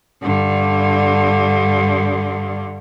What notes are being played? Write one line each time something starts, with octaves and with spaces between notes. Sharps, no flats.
G2 D3